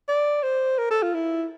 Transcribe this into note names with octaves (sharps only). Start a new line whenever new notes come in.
D5
C5
A#4
A4
F4
E4